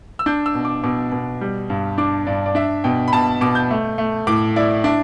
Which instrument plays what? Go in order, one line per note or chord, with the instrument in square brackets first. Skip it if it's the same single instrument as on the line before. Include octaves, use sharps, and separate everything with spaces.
[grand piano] E6
D4 G6
E6
B2
D6
B2 D6
B2
G3
G2
D4 D6
G2 D5
D5
D4 E5
B2 G5
B5
B2 A5
B2 D6
G6
A3
A3
A2 D6
E4 D5
D4 E5